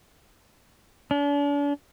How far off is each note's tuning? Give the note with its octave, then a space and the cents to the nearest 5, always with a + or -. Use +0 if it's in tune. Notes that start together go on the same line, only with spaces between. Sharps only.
D4 -40